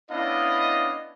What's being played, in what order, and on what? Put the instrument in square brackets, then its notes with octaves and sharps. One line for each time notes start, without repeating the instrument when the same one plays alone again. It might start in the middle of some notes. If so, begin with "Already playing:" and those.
[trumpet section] B3 C#4 D4 E4 D#5 F5